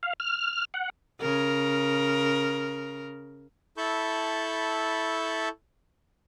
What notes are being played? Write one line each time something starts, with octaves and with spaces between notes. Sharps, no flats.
F5
F6
F#5
C#3 A#4
E4 A4 A5 B5 C#6 G6